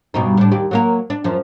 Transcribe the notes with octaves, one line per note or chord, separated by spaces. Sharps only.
G2 B2 D#4
A2 D4
D#2 G4 D5
F#3 A#3 A#4
D4
F#2 F3